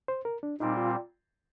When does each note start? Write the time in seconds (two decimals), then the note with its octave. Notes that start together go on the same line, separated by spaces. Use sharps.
0.08 C5
0.25 A#4
0.43 D4
0.60 A#2 G3 C4 D#4
0.77 F4